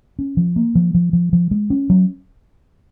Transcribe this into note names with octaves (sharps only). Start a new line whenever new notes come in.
C#4
F3
A#3
F3
F3
F3
F3
G#3
C#4
F#3